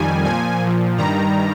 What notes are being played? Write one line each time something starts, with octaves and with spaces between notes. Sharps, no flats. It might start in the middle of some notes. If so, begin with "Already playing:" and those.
Already playing: F2 D#3 G3 G#5
A#2 F3 G#5
A#2 F3
G2 D#3 G3 A#5